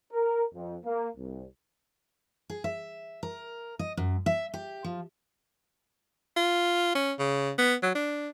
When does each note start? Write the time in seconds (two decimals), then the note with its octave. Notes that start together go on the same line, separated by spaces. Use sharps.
0.12 A#4
0.54 F2
0.85 A#3
1.17 C2
2.50 G#4
2.64 E5
3.23 A#4
3.79 D#5
3.97 F#2
4.26 E5
4.54 G4
4.84 F3
6.37 F4
6.95 C#4
7.19 C#3
7.59 B3
7.83 F#3
7.95 D4